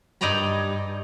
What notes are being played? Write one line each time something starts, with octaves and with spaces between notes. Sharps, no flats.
G2 D#4 D5 D#5 A#5 B5